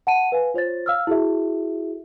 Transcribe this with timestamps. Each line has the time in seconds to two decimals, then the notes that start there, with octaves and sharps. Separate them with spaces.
0.07 F#5 A5 D#7
0.32 B4 F5 G#5
0.54 F4 C5 C#5 A6
0.86 F5 E6 F6
1.07 E4 F#4 G#4 A4 E5